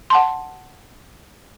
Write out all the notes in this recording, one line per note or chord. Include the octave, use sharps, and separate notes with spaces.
F#5 A5 C6